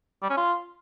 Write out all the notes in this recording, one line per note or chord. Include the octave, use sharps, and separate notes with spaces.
G3
C#4
F4